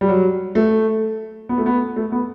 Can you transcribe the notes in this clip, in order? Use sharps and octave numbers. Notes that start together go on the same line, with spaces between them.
G3
F#3
A3
B3
A3
B3
A3
B3